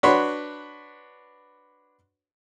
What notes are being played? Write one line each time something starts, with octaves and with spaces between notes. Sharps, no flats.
D4 F#4 B4 C#5 C6